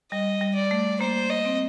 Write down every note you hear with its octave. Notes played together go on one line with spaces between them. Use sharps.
G3 D#5
G3
D5
A3
A#3 C5
D#5
C4